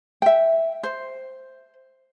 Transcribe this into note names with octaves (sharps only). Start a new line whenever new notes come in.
E5 G5
C5